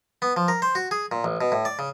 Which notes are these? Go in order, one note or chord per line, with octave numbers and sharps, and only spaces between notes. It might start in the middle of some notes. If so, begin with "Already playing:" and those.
B3
F3
A#4
C5
F#4
G#4
A#2
A1
B2
A2
D5
C#3